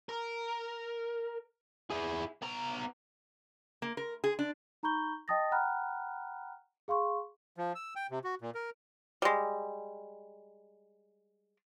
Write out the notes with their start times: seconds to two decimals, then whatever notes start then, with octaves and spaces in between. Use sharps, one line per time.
0.09 A#4
1.90 E4 G#4
2.42 B3 A#5
3.82 A#3
3.97 A#4
4.24 G#4
4.39 D4
4.83 D#4 A#5 B5 C#6 G6 G7
5.28 D#5 G5 A5 D#6 A6 A#6
5.51 F#5 G5 A#5 B5 F6 F#6
6.88 G#4 F5 C6 C#6
7.56 F3
7.75 E6
7.96 G5
8.11 C3
8.24 F#4
8.41 A#2
8.55 A#4
9.22 G3 G#3